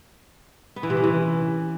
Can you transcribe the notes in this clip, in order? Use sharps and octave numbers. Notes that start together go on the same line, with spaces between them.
B3
E3
C3
C#4
E3